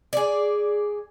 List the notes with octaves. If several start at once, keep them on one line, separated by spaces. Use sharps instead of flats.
G#4 D5